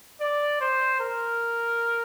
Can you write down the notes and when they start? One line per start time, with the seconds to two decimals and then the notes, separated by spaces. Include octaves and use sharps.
0.21 D5
0.61 C5
1.00 A#4